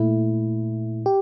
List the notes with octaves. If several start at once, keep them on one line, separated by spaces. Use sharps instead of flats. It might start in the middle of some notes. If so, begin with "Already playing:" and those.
Already playing: A#2 A3 E4
G4